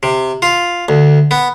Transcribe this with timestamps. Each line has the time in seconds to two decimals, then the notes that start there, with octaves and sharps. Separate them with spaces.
0.03 C3
0.42 F4
0.89 D2
1.31 B3